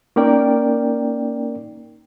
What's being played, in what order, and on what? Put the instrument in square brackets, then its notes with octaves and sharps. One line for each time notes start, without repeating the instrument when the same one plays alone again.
[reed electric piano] A#3 C#4 D#4 A#4 D5 G5